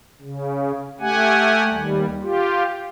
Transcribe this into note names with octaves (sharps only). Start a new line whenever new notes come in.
C#3
A3 G4 F#5 G#5
D#2 G3
F4 G4